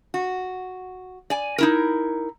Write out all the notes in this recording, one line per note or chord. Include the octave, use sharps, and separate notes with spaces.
F#4
D5 G#5
D#4 E4 A#4